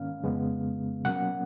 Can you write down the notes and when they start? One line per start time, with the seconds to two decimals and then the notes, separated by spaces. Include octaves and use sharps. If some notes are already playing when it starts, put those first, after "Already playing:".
Already playing: G#2 D#3 A#3 C#4 F5
0.24 F2 C#3 G#3 B3
1.04 B2 F#3 A#3 C#4 F#5